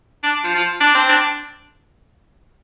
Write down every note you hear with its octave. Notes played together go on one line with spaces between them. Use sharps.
D4
F3
F3
D4
C4
D4